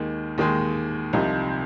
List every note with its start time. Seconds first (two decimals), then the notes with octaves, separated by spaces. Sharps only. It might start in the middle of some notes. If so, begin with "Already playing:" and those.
Already playing: D#2 D#3 G#3
0.38 D#2 D#3 G#3
1.13 C2 C3 F3 C4 D#4